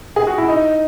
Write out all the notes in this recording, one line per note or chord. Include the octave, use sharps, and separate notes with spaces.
G#4
F#4
E4
D#4